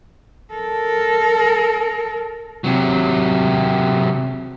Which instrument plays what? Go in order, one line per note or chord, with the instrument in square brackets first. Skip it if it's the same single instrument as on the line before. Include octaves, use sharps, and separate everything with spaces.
[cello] A4 A#4
[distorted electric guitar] C3 F#3